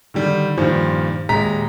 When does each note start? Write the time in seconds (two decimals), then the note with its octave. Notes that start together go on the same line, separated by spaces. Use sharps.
0.14 D3 D#3 G3
0.57 G2 A#2 D#3 F3
1.29 D#1 G#3 A#5 B6